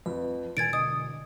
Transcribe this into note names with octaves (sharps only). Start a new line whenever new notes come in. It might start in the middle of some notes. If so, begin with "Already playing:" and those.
F2 B4
E1 E3 G#5 G#6 A6 D7
D3 D#5 D#6